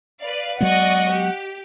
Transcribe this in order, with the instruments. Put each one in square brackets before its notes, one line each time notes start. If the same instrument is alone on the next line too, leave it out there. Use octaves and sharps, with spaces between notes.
[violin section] B4 D5 F5
[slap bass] F#3 G#3 B3 [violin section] D5 D#5 C#6 [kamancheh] F#5
[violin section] G4